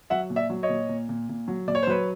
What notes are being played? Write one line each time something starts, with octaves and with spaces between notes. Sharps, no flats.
F#3 E5 F#5
A#2
D5 E5
F#3
C#5 D#5
A#2
A#2
A#2
A#2
F#3
A#2 D5
C#5
C5
F#3 B4 C#5